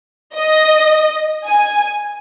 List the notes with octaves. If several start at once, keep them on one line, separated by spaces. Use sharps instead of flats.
D#5
G#5